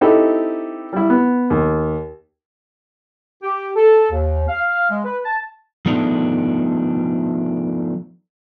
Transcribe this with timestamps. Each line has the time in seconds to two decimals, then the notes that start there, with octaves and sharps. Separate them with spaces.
0.01 C4 D#4 E4 G4 A4
0.93 G3 E4
1.10 B3
1.50 D#2
3.43 G4
3.76 A4
4.11 D#2
4.48 F5
4.90 G#3
5.05 B4
5.25 A5
5.86 F3 A3 B3 D4 D#4